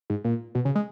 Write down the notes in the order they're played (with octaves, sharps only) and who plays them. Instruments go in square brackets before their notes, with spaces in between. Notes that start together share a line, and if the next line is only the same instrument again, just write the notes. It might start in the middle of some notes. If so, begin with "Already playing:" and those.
[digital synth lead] G#2
A#2
B2
C#3
G#3